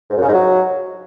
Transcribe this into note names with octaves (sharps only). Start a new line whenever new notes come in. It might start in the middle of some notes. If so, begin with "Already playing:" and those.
G#2
F#2
C#3
G#2
F#3